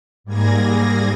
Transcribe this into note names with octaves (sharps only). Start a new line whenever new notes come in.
G#2 G3 A#3 G#4 G#6 A#6